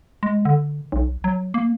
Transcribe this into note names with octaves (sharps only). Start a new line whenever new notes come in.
G#3
D3
B1
F#3
A#3